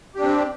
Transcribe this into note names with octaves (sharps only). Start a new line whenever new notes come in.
C4 D4 G4